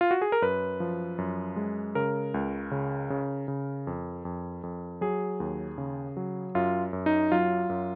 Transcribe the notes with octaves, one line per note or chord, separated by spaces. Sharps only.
F4
F#4
G#4
A#4
F#2 B4
F3
F#2
G#3
C#3 A#4
C#2
C#3
C#3
C#3
F2
F2
F2
F#3 G#4
D#2
C#3
F#3
F#2 F4
F#2
D#4
F#3 F4
F#2